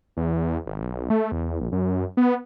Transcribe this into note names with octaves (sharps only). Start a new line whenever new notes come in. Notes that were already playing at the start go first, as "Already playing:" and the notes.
E2
G#1
B1
A3
E2
A#1
F#2
B3